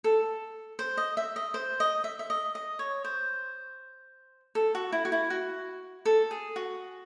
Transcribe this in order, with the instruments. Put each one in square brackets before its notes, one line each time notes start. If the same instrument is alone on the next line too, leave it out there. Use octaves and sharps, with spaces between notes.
[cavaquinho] A4
C5
D#5
E5
D#5
C5
D#5
E5
E5
D#5
D#5
C#5
C5
A4
F#4
E4
F#4
E4
F#4
A4
G#4
F#4